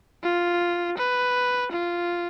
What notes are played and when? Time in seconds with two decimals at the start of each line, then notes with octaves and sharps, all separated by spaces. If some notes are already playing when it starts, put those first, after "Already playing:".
0.23 F4
0.98 B4
1.72 F4